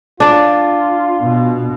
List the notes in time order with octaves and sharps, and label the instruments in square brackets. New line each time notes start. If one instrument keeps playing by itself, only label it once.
[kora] D4 D5 [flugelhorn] F4
[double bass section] B2